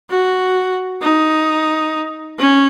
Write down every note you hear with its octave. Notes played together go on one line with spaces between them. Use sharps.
F#4
D#4
C#4